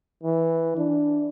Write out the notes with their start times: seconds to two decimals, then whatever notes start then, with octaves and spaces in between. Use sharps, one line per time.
0.23 E3
0.77 D4